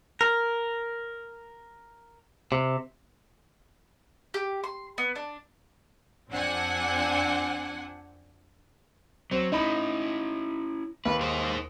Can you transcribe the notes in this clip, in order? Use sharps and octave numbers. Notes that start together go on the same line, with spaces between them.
A#4
C3
G4
C6
B3
D4
F2 C4 D4 F#5 G#5
F#3 C4
C#4 D#4 E4 B5
D#2 B4
D#4 G#4 C5